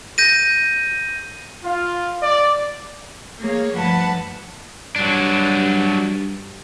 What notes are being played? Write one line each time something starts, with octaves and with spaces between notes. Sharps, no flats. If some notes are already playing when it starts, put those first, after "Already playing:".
G6 A#6 D#7
F4
D5
A#3 G#4 C#5
D2 G2 F3 B4 F#5 A5
G2 F#3 D4